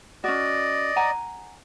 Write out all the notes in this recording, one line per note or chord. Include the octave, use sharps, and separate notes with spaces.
C#4 F#4 D5 D#5
F#5 G#5 A#5